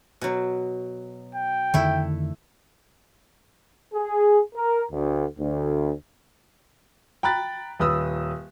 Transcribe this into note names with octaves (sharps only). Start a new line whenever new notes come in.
B2 F#3
G5
F2 D3 D#3 A3 E4
G#4
A#4
D2
D2
G5 A#5 B5 F#6 A6
D#1 B4 D#6 E6